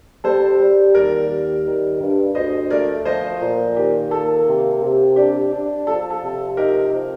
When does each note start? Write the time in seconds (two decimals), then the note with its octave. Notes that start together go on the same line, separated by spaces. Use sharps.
0.24 G3 A4 C5
0.59 G3
0.95 D#2 A#4 D5
1.29 G3
1.65 D#3
2.00 G2
2.35 D2 C5 D#5
2.70 A3 A#4 D5
3.05 F3 C5 D#5
3.40 A#2
3.76 D#3 G4
4.11 A#3 A4
4.46 C3
4.81 C3
5.16 D4 G4
5.52 D4
5.87 F3 A4
6.10 A4
6.22 C3
6.57 D#4 G4 A#4
6.92 F3